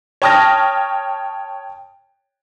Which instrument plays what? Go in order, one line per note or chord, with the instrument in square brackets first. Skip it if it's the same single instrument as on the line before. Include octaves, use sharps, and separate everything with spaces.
[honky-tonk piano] C#5 G5 A5 D#6 F6 A#6